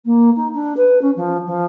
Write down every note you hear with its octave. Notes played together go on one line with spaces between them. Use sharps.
A#3
D#4
D4
B4
C#4
F3
F3